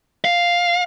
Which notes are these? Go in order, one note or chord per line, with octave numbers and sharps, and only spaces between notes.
F5